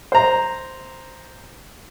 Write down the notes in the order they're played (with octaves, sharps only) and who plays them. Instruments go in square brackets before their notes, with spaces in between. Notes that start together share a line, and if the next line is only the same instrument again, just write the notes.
[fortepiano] C5 A#5